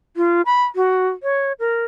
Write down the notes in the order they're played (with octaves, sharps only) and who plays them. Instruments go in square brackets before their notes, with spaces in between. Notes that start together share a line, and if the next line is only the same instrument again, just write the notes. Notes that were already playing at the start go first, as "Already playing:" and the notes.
[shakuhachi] F4
B5
F#4
C#5
A#4